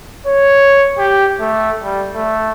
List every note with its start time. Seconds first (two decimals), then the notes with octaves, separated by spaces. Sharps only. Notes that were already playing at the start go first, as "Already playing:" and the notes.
0.26 C#5
0.98 G4
1.40 A3
1.84 G3
2.15 A3